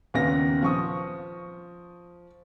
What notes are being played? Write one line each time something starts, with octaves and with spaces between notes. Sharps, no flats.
D#2 A#2 C#3 B3 C#4 A#6
F3 C#6 D#6